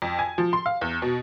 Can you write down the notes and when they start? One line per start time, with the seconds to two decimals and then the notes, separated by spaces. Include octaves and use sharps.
0.02 F2
0.19 G#5
0.38 F3
0.53 C6
0.66 F5
0.81 E2
1.02 B2